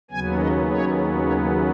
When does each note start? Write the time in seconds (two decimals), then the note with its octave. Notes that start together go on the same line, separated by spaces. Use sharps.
0.11 D#2 C#3 F#3 B3 G#5
0.39 D#5
0.68 C#5
1.24 C#5